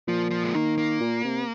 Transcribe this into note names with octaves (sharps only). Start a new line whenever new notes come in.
A#2 F3
F3
G#3
D#3 A#3
A#3
A#2
C3